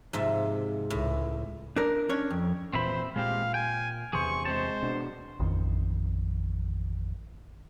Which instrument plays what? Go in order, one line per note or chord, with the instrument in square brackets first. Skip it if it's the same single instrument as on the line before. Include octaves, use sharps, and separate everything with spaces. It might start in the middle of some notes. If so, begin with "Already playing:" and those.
[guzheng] G#2 F3 E5 [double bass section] C3
[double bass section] C#2 [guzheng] A2
[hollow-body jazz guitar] D4 A#4
C#4 D4 C#5
F2
[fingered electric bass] E1 A#2 E3 [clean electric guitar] C4 E5 B5 [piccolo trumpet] C5
[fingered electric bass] A#2 [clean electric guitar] G#3 C4 G4 [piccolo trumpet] F5
[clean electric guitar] G5 [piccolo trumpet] G#5
[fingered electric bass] E2 C3 E3 [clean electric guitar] G#4 C5 [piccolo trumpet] C#6
[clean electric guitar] G#3 C4 A5 [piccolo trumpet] C5
[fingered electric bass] B2 B3 D4
[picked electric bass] A1 F2 D#3